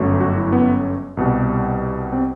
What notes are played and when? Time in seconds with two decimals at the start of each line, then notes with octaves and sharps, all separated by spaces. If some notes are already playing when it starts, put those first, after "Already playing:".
Already playing: G1 F#2 F#3 A3
0.20 F#4
0.36 E4
0.52 B3
1.17 C2 B2 G3
2.13 C4